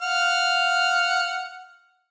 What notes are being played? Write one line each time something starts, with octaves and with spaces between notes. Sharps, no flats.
F5 F#5 F6